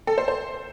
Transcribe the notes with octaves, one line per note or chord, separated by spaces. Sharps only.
A4
C5
C5